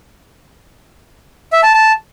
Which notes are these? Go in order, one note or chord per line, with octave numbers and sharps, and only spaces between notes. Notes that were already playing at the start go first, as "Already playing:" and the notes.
E5
A5
A5